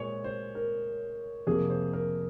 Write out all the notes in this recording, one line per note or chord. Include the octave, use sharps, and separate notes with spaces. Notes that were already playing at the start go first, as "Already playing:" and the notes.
Already playing: A#2 G#3 C5 C#5
C5
A#4
F2 C3 F3 A#3 G#4
C5
A#4